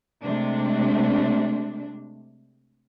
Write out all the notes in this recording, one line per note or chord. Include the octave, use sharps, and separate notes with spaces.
C3 G#3 A3 D4